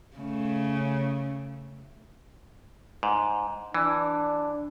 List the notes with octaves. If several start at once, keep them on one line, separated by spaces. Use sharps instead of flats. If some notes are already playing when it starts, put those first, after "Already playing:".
C#3 A3
G#2
E3 D4